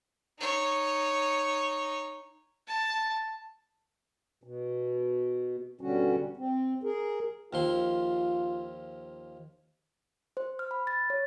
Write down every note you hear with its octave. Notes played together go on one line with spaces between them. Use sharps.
D#4 C#5
A5
B2
B2 D3 G3 C#4 F#4
C4
G#4 A#4
D#2 F3 F4 C6
C5
F6
B5
A6
C#5